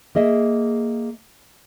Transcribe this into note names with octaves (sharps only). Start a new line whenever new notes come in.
A#3 G#4 D#5 E5